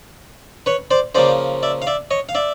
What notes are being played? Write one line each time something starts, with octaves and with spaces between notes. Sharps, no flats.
B4 C#5
C5 D5
C#3 F3 A#3 C5 D5
D5 E5
F5
D5 E5
C#5 D#5
F5
D5 E5